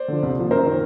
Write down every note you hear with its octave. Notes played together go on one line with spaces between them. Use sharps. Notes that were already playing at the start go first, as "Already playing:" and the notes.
Already playing: C5 D5
D3 F3
C2
A#2 F3
F#2 A#4 C5
D#3